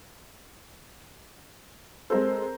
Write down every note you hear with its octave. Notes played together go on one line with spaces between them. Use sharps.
G#3 C4 A4 A#4 C5